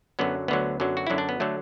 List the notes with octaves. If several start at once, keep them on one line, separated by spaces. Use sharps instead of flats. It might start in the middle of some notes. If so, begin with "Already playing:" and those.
F#2 D3 F#3 B3
D2 D3 F#3 B3
F#2 D3 F#3
F#4
F#2 D3 F#3 E4
D4
B3
D3 F#3 A3